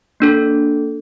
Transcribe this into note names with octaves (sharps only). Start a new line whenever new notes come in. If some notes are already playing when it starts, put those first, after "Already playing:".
A#3 D4 A4